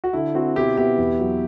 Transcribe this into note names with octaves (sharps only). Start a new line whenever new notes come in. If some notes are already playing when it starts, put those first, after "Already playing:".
F#4
D3 E4
C4 F#4
B2 E4 G4
B3 E4 G4
E2
F#3